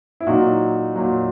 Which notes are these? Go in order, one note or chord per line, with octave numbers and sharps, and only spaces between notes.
E4
A#2 F#3 D#4 F#4
A#2 F#3